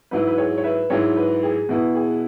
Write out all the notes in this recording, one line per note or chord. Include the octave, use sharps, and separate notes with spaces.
G#2 F#3 E4 B4
B4
G#4 C#5
C#5
B4 E5
G#2 F#3 E4 G#4 C#5
B4
G#4
B2 B3 E4 B4
G#4